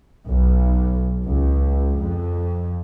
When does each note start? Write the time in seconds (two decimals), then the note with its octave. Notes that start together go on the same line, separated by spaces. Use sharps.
0.25 B1
1.21 C#2
1.99 F2